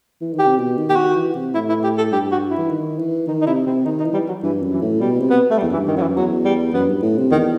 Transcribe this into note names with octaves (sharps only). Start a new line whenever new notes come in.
E3
D#3
G4
C3
B2
D#3
G4
D#3 F#4
E3
C3
A2 E4
E4
G4
A4
G2 G4
F#4
E4
E3
D#3
E3
D#3 D#4
D#4
C3 E4
C3 C4
D#3 D#4
D#4
E3
G3
F#3
G2 E3
F#2
E3
A2
B2 G3
C3
B3
A3
G3
E2
F#2 E3
G2
D#3
F#2 E3 F#3
E2 F#3
G3
F#2 B3
G2
A2
C3
E2 D#3